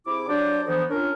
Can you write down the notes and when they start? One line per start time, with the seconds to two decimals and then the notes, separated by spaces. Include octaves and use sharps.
0.07 C3 E4 G#4 D6
0.28 F#3 D4 G4 C5 D5
0.67 D3 E3 F3 B3 D#4 C5
0.89 C#4 D4 F4 A#4